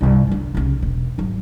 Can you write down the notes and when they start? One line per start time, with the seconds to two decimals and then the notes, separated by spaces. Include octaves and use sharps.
0.01 C2 G2
0.27 G#2 D3
0.55 C2 C#3
0.82 E1
1.18 G#1 F#3